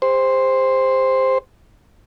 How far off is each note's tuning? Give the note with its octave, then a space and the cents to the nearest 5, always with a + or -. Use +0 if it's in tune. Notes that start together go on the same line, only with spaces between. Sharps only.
G4 +45 C5 +0